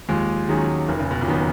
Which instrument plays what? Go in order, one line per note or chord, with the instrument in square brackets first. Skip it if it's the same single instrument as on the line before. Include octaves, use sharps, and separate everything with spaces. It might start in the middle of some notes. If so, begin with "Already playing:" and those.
[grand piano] D#2 [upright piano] F3 G#3
[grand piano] D#3 F#3 C#4 G#4
[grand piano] F1 [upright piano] D#3
[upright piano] C#3
B2
A#2 C#3
[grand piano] D#3 F#3 B3